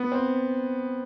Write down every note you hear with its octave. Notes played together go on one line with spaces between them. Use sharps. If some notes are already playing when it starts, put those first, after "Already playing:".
Already playing: B3
C4